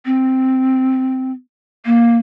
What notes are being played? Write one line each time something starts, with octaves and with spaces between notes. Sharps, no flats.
C4
A#3